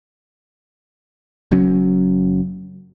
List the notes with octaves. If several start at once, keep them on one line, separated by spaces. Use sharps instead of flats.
F#1 F#2 F#3 C#4